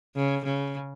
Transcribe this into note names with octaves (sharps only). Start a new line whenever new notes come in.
C#3
C#3